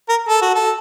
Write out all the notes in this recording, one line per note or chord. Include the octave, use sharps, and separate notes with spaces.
A#4
A4
F#4
A4